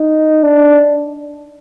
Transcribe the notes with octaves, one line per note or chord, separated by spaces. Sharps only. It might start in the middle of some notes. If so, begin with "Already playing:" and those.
Already playing: D#4
D4